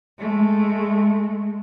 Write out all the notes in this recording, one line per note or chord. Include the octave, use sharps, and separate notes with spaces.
G#3 A3